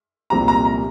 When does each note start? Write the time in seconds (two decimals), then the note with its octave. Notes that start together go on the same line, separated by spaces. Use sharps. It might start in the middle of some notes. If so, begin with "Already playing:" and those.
0.30 C2 A#2 F3 C4 G4 A#5
0.48 A#5
0.65 A#5